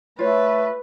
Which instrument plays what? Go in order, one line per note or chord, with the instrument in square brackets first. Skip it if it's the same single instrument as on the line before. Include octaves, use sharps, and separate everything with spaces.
[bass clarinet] A3 [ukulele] F4 C#5 [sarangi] B4